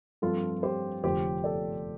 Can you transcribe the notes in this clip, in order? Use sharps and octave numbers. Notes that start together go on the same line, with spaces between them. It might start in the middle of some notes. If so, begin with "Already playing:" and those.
G2 F3 A3 C4 F4 A4
G4 C5
F1 F2 D3 G4 C5
A4 D5